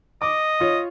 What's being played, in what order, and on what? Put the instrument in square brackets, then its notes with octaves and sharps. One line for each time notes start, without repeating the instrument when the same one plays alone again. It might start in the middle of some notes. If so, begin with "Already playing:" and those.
[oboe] D#5 [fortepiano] D6
[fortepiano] F4 C#5